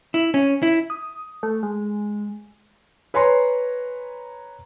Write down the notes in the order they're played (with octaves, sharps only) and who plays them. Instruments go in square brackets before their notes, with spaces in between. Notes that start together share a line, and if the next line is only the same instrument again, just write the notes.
[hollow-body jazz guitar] E4
C#4
E4
[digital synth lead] D#6
A3
G#3
[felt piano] B4 C#5 G#5 A#5 C6